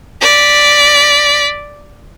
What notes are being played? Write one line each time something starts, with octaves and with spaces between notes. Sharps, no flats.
D5 B6